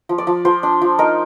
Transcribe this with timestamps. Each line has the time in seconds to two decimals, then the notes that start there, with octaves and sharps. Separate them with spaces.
0.09 F3
0.18 D5
0.27 F3
0.45 F3 C5
0.63 D4
0.81 F3
0.99 D#4 A#4